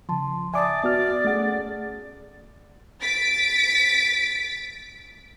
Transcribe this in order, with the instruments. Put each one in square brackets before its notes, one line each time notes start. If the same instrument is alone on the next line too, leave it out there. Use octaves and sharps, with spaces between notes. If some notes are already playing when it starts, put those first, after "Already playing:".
[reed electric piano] C#3 F3 [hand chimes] A5 C6
[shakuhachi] D5 [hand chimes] E5 A5 D#6 [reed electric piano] G#5 D6
[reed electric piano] B3 F#4 F6
[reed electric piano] A3 F#5 [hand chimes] C#4 G#4
[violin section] A6 B6 D7